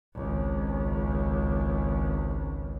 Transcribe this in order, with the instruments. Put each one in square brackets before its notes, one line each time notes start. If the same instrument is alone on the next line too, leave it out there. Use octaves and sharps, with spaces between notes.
[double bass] G#1 C#2